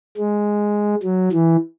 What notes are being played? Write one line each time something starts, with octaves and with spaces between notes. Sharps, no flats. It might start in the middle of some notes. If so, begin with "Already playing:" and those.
G#3
F#3
E3